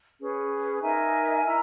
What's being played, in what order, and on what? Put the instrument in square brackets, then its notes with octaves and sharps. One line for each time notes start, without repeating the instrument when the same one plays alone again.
[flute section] C#4 G#4 B4
D#4 A#4 E5 G#5
E4 A#4 E5 A#5